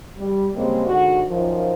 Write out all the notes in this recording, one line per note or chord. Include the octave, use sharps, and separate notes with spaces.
G3
C#3 G3 G#3 A#3 C4
G#2 D3 F#4
F#2 D#3 F3